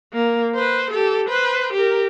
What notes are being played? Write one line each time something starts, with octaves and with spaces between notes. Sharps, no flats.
A#3
B4 C5
G4 A4
B4 C5
G4 A#4